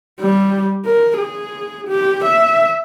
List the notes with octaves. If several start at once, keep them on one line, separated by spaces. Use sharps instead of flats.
G3
A#4
G#4
G4
E5